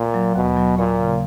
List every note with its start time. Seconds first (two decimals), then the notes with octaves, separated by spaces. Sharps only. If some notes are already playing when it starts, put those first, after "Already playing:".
Already playing: A#2
0.14 F#3
0.35 D#2 B2
0.57 F#3
0.78 A#2 A#3
1.00 C#3